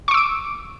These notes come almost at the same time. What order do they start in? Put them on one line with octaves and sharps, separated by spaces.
C#6 D6 E6 D7